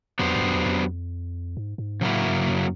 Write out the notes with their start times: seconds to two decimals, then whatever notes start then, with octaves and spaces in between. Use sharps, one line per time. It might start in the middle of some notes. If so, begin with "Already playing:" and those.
0.19 F2 F#3 B3 D4 G4 C5
0.35 G2
0.42 F#2
0.53 E2
0.66 F2
1.57 G#2
1.78 G#2
2.01 A2 C#3 F#3 A#3 C#4 E4
2.25 G2
2.48 F#2